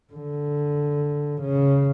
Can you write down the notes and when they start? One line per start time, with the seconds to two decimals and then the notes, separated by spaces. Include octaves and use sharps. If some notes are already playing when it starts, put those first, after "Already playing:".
0.13 D3
1.42 C#3